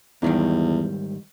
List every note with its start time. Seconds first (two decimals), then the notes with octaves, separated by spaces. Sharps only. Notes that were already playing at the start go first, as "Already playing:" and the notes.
0.22 E2 G#2 D#3 G3